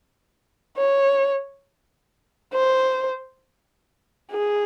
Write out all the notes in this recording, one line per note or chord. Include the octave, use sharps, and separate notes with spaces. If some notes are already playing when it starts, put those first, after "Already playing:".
C#5
C5
G#4